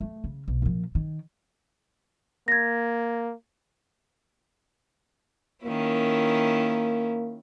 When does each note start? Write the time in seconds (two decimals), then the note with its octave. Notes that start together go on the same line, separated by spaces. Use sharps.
0.01 A3
0.24 C#3
0.48 B1
0.62 A#2 F3
0.95 D#3
2.48 A#3 G#6 A#6
5.64 D#3 A#3 C#4 E4